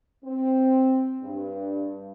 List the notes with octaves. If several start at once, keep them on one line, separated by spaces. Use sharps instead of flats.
C4
G2